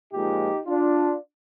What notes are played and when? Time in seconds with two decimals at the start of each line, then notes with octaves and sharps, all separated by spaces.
0.13 A#2 F3 G#3 D#4 G4
0.66 D4 F4